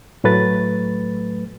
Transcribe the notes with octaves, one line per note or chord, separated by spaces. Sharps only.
A2 F#3 A3 B4 A6